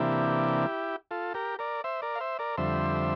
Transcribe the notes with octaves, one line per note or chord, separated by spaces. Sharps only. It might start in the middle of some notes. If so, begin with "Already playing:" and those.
Already playing: C3 E3 A#3 D4 E4 G4
F4 A4
G4 A#4
A#4 D5
C5 E5
A#4 D5
F5
C5 E5
A#4 D5
F2 D3 G3 C5 E5